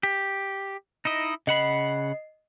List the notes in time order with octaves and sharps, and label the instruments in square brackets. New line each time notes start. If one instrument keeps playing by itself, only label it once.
[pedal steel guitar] G4
D#4 E4 D#5
[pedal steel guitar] C#3 F#5 B5 [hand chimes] D#5 C7